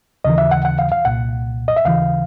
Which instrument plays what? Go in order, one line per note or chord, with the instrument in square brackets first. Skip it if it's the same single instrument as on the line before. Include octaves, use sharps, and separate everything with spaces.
[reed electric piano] D#2 C#3 E3 D#5
E5
F#5
F#5
F5
F5
C2 A#2 F#5
D#5
E5
D#2 C#3 E3 F5